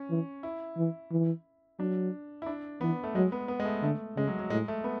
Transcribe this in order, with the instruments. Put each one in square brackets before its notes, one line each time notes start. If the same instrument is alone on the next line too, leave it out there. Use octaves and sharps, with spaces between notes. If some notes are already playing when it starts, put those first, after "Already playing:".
Already playing: [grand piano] C#4
[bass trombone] E3
[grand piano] E4
[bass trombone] E3
E3
[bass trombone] F#3 [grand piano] D4
[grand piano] E4
D4
[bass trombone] E3 [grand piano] B3
[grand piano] A3
[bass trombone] F#3 [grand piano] G#3
[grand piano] B3
B3
G#3
A3
[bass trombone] D3 [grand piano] A3
[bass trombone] C#3 [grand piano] G#3
[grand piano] F#3
F#3
[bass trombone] A2 [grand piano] G#3
[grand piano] A3
B3